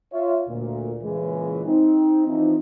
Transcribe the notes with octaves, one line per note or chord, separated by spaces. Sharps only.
F4 C#5 E5
D2 A#2
A#2 C#3 E3 G#3
C4 D#4
E3 F3 C4 D#4